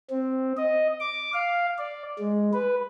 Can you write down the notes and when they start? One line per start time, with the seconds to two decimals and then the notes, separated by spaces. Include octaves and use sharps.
0.10 C4
0.57 D#5
1.00 D6
1.34 F5
1.78 D5
2.19 G#3
2.53 B4